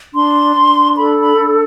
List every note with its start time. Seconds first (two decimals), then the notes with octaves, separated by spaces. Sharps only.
0.14 D4 C6
0.56 D4
0.96 A4 B5
1.17 B5
1.37 D4